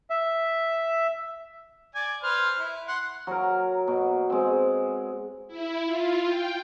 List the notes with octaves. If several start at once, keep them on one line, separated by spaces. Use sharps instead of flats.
E5
D5 G#5
B4 C5 F6
E4
F#5 C6
F#3 A#4
B2
G#3 C4
E4
F4
G5